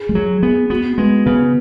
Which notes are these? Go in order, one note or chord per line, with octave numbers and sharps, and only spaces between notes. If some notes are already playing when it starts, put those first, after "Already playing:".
Already playing: G#4
G#3
F#3 G#4
B3 G#4
B3 F#4
G#3 B3
C#3 B3